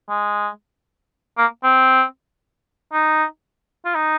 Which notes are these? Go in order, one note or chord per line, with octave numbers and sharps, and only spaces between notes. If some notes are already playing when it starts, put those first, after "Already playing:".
G#3
A#3
C4
D#4
F4
D#4